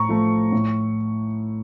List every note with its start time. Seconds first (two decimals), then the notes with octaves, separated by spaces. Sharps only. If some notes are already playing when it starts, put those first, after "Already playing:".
Already playing: A2 A#5 C#6
0.09 F3 A3
0.52 A2